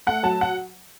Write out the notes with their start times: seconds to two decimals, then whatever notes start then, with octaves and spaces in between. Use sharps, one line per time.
0.07 A3 F#5
0.23 F#3 A5
0.41 F#5